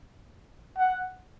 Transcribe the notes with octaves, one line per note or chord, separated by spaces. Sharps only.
F#5